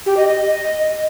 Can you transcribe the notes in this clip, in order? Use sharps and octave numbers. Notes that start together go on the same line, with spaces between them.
G4
D#5
D#5